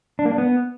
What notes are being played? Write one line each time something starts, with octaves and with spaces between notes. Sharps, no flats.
D4
A#3
D4
B3